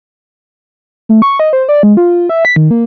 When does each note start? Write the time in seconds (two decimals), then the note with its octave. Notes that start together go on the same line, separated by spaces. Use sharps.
1.09 A3
1.22 C#6
1.40 D#5
1.53 C5
1.69 D5
1.83 G#3
1.97 F4
2.29 E5
2.45 B6
2.56 D#3
2.71 A#3